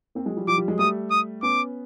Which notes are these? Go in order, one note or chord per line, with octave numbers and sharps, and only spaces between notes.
A#3 C4
F#3 G#3
F3 G3
F3 G3 D6
F3 G3
F#3 G#3
G3 A3 D#6
D#6
B3 C#4 D6